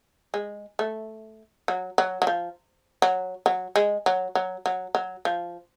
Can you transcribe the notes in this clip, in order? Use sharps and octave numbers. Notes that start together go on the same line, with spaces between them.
G#3
A3
F#3
F#3
F#3
F3
F#3
F#3
G#3
F#3
F#3
F#3
F#3
F3